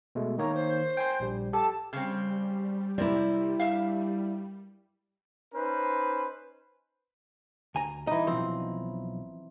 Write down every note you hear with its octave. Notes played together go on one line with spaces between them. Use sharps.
B2 G#3 A3
D#3 A#3 C#5 A#5
C5
G5 G#5 C6
A#1 G3
G4 A4 A5
C#3 G3 C4
C3 E4 A#4 D5
G2 E5 F5
C#4 D#4 B4 C5
D2 G#5 A#5
E3 D#4 D#5
B1 F3 C4